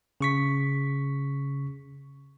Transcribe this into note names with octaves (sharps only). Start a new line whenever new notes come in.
C#3 C#6 B6